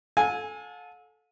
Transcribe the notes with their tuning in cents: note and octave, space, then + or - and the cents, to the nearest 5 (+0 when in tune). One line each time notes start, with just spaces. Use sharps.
A4 -20 F5 +45 G#5 -5